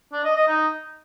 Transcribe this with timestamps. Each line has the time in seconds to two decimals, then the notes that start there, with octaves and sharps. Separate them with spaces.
0.13 D4
0.24 D#5
0.36 D#5
0.48 D#4